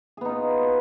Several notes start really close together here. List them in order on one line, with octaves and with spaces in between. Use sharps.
G#4 B3 D#4 F4